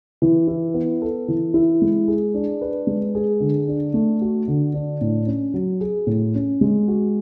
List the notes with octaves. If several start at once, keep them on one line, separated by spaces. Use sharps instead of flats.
E3
E4
B3
A4
E3
E4
G#3
G#4
D4
B4
G#3
G#4
D3
D4
A3
F#4
D3
D4
A2
C#4
F#3
G#4
A2
C#4
G#3
F#4